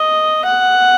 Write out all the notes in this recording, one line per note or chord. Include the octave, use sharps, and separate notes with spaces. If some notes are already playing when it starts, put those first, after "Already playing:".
Already playing: D#5
F#5